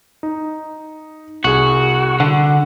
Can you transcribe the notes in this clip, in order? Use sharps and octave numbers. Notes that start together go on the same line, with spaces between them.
D#4
C2 F#4 G#4
D3 F#5 F#6